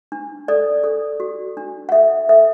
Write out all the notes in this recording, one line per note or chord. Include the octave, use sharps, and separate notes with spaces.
D4
A4 D5
A4
F#4
D4
F#5
A4 E5
A4 E5